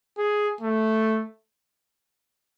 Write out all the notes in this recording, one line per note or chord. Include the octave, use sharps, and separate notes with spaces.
G#4
A3